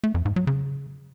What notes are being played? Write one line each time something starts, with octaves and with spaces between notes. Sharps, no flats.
A3
F2
G#2
F#3
C#3